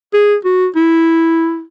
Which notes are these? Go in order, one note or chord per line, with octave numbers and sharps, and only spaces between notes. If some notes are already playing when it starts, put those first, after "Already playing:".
G#4
F#4
E4